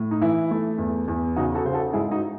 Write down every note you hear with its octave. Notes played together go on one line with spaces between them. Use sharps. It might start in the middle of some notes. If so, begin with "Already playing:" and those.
Already playing: A2
D#4
E3 E4
A3
E2
E2
C#3 D#4 F#4
F#4 A4
C#3 C5
F#4 A4
G#2 E4 G#4
D#4 F#4